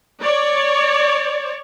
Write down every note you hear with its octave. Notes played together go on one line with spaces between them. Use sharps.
C#5 D5